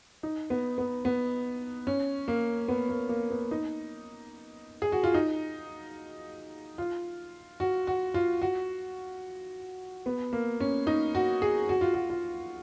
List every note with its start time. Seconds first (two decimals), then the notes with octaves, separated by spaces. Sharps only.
0.23 D#4
0.50 B3
0.78 B3
1.05 B3
1.87 C#4
2.28 A#3
2.68 B3
2.89 A#3
3.09 A#3
3.30 B3
3.51 D#4
4.82 G#4
4.92 F#4
5.04 F4
5.14 D#4
6.78 F4
7.60 F#4
7.87 F#4
8.14 F4
8.42 F#4
10.06 B3
10.33 A#3
10.60 C#4
10.87 D#4
11.15 F#4
11.42 G#4
11.69 F#4
11.81 F4
11.94 F#4
12.10 F4